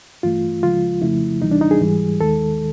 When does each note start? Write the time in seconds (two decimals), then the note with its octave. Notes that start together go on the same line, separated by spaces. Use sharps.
0.23 G2 E3 A3 F4
0.63 C#2 C#3 F3 G#3 F4
1.02 F2 C#3 F3 A3 E4
1.42 D2 C3 E3 G3 D#4
1.51 D4
1.61 D#4
1.71 G#4
1.80 G#2 E3 G3
2.20 D#2 D#3 G#3 A4